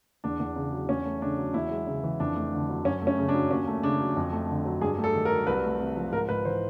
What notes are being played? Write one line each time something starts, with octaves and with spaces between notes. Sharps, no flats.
E2 D4
E2
C#3
F#3
E2 C#4
A3
C#3 D4
F#3
E2 E4
G#3
C#3
E3
F2 D4
A3
D3
F#3
F#2 C#4
A3
C#4
C#3
D4
F#3
D#2 C#4
A3
C#3 D4
F#3
F2
A3
D3
F#3
G2 G#4
A3
A4
D#3
A#4
F#3
C2 B4
A3
C3
F3
G#2 A#4
G#2 B4
E3 C5